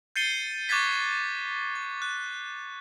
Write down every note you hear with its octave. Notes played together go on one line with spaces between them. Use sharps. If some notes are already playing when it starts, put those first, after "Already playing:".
G6 A6 C7 C#7 D#7 G7
C#6 D6 F#6 G#6 A6 B6
G#6
F#6